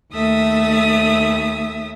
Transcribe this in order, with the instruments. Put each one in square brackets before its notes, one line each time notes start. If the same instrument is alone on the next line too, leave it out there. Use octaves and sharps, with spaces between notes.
[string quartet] D#2 A3 E5 D#6